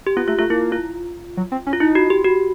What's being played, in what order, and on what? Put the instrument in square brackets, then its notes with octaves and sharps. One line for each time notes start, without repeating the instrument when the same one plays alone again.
[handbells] G4
[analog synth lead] B3 [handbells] F4
[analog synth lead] A3 [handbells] F4
[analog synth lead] A3 [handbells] F4
[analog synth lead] A#3 [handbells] E4
[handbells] F4
[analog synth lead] F#3
C4
C#4
[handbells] F4
[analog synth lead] D#4 [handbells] E4
[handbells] F#4
G4
F#4